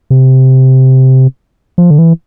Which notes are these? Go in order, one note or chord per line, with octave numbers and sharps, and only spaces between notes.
C3
F3
D3
E3